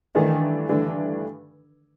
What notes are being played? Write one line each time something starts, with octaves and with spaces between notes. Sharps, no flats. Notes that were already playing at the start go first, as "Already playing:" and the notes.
G2 D#3 E3 A3 D4
G2 D3 E3 A3 D4